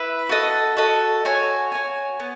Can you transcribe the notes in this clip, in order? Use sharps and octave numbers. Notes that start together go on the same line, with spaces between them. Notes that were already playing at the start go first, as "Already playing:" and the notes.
Already playing: E4 B4 E5
F#4 A4 D#5
F#4 A4 D#5
F#4 C#5 G#5
F#4 C#5 G#5
B3